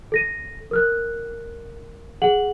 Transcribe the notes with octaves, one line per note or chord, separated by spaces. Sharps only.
A4 A#6 D#7
A#4 F6 F#6
G#4 F#5 F#7